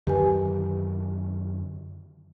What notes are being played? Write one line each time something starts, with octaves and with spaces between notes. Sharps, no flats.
F#2 D3 D#3 G4 B4 G#5